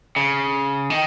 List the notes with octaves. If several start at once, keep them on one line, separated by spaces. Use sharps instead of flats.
C#3
D#3